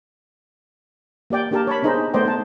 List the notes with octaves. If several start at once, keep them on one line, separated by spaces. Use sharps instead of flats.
A#3 G4 D5 G5
A#3 D4 G4 A#4 A5
C#5 A5 B5
B3 D4 D#4 G#4 C5
A3 B3 C5 D5 D#5 G5
D#4 A5